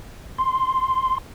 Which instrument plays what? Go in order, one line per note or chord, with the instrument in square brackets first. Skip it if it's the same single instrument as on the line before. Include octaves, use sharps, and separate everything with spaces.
[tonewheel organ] C6